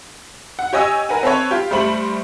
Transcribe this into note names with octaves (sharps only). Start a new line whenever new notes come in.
F#5
G4 C#5 D#5 G#5 E6
A#4 B4 F#5 G#5
C4 A4 B4 C#5
F4 G4
G2 G3 A3 C5 B5 F#7